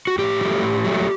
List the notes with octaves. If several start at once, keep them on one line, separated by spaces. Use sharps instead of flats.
F#4
A2 G4
F#3 A3
A2
F#3 A3